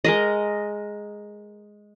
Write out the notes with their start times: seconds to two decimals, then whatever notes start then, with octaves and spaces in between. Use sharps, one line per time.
0.04 G#3 A#4 D#5